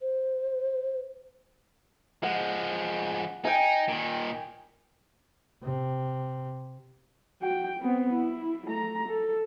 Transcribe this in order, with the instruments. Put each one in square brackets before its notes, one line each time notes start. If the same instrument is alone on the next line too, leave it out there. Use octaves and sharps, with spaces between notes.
[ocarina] C5
[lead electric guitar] F3 G#3 [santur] F#5
[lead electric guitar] D#4 [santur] G5 G#5
[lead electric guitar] A#2 D#3
[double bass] C3
[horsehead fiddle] F#4 G5
B3 C4
E4
A3 A#5
A4